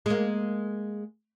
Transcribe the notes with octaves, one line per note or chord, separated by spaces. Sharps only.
G#3 A#3